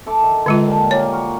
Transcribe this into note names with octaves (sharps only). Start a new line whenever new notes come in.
A4 E5 D6
D#3
D3 G#3 F4
A#2 G3 A5
A#2 A#3 C#5 D5
F#4 A#4